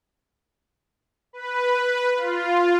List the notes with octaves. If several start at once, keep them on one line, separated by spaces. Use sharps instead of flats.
B4
F4